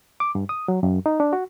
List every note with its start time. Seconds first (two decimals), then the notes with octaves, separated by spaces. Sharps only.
0.20 D6
0.35 G2
0.49 D#6
0.68 F#3
0.83 F#2
1.06 D#4
1.20 D4
1.33 F#4